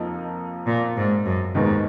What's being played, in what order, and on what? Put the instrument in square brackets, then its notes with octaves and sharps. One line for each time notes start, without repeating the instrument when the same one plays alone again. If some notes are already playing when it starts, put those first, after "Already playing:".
Already playing: [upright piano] F2 F3 A#3 D#4
[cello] A#2
G#2
F#2
[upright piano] D#2 D#3 G#3 B3 [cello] G#2